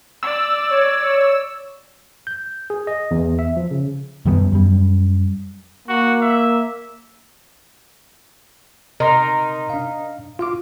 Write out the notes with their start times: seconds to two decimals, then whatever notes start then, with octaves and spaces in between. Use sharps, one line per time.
0.23 D5 E6
0.71 C#5
2.27 G6
2.70 G#4
2.87 D#5
3.11 E2
3.39 E5
3.57 F3
3.71 C#3
4.26 F#2 D#3 G3 B3
4.52 F#2 G3
5.88 A#3 F#4
6.22 E5
9.00 C3 D#4 A#4 C6 A#6
9.70 D4 F5
10.39 F4 F5 D6